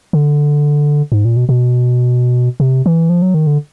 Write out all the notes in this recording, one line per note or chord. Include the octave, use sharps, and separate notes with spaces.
D3
G#2
A#2
B2
B2
C3
E3
F3
F#3
D#3
D3